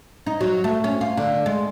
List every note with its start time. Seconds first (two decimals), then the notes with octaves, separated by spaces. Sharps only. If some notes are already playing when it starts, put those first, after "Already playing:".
0.26 D#4
0.41 F#3
0.64 A3
0.84 C#4
1.01 F4
1.17 D3
1.46 G#3